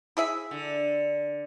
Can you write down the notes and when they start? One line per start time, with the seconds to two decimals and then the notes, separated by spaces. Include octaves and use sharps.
0.17 E4 G#4 E5
0.51 D3